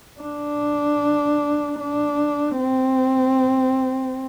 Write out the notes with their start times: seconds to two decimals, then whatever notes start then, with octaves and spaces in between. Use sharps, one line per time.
0.20 D4
1.80 D4
2.60 C4